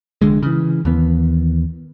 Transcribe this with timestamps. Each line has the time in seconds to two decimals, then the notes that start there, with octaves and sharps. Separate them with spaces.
0.22 F1 C2 D3 G#3
0.43 C#3 E3
0.85 D#2 E3 B3